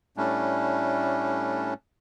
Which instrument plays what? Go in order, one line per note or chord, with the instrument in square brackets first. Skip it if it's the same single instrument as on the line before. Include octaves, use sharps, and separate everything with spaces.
[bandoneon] A2 G3 A3 C#4 D4